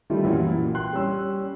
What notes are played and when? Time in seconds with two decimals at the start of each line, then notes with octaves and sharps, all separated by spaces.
0.10 D#3 G3 A3 E4 F4 G4
0.24 F#2 A#2 E3 F#3
0.48 A#2
0.75 G5 C6 F#6
0.93 G3 C#4 E6